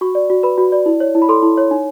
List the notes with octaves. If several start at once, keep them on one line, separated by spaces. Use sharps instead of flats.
F#4 C#6
D5
F#4
B4 B5
F#4
D5
E4
C#5
E4
B5
A4 C6
E4
C#5
D#4